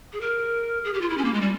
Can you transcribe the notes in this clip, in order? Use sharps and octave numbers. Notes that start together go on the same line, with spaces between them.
G#4
A#4
G#4
G4
F4
E4
C#4
A#3
G#3
G3